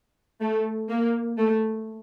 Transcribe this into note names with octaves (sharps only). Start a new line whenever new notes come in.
A3
A#3
A3